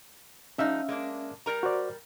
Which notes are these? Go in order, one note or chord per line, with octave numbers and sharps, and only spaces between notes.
F3 G#3 C#4 D#4 E5 F5
G#3 A#3 D4
G3 A#4 A#5
F#4 C5 D5